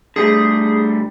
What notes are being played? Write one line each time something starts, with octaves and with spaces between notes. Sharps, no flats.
D3 G3 A3 G#4